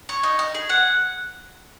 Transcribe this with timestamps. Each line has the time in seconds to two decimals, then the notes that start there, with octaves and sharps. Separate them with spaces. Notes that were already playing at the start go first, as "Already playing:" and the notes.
0.09 C#5
0.23 D#4
0.39 D#4
0.54 G#4
0.69 F#5